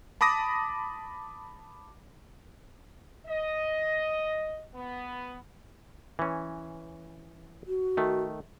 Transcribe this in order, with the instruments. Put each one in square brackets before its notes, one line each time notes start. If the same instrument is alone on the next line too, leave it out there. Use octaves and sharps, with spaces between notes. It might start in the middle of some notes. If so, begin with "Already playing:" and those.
[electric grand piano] A5 B5 D6 D#6 A#6
[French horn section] D#5
B3
[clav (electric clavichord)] E3 C#4
[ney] F#4
[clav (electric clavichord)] D#3 A3